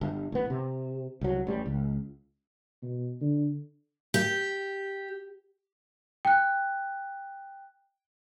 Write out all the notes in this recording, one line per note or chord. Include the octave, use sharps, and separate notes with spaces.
G1
A1 B3
C3
C2 F#3
A1 G3
C#2
B2
D3
G4
G5 F#6